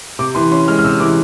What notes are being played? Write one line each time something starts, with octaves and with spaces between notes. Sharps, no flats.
C3 D6
E3 C6
C#4 C6
G#3 F6
F6
C3 E6
E3 D6